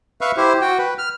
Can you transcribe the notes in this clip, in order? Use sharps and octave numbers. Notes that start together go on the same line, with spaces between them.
B4 E5 F5 C#6
E4 G4 C5
F#4 G5
B4
F6